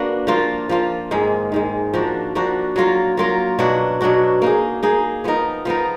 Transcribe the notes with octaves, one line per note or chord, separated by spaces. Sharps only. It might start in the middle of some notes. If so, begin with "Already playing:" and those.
Already playing: A#3 D4 F#4 B4
F3 A#3 F4
F3 A#3 F4
G#2 D#3 G#3
G#2 D#3 G#3
F3 A#3 D4 F#4
F3 A#3 D4 F#4
F#3 A#3 F4 A#4
F#3 A#3 F4 A#4
B2 F#3 D4 F#4
B2 F#3 D4 F#4
A#3 D#4 G#4
A#3 D#4 G#4
F3 B3 D#4 A#4
F3 B3 D#4 A#4